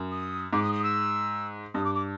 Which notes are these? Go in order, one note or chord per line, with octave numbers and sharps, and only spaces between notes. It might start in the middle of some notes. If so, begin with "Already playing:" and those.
Already playing: F#2
D#6
G#2 D6
D#6
D#6
E6
G2 D#6
D6
D6